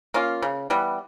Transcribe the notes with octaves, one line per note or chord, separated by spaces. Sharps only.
A#3 C#4 F4
C#3
E3 G3 B3